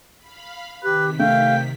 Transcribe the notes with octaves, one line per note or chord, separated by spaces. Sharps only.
F5 B5
C3 D#3 G4 B4 B6
A3 F5 G5